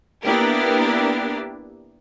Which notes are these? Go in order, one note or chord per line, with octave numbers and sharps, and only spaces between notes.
A#3 B3 D4 E4 G4 A#4